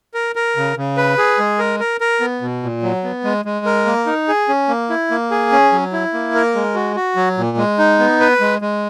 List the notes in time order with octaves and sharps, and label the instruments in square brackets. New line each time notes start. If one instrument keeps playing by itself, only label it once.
[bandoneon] A#4
A#4
C#3
C#3
B4
G#4
G#3
A#4
A#4
A#4
B3
B2
A#2
F#3
B3
G#3
G#3
A#4
A#3
D#4
G#4
C#4
A#3
E4
A#3
G#4
C#4
F#3
E4
A#3
A#4
G#3
F#4
F#4
F#3
A#2
G#3
D#4
B3
B4
G#3
G#3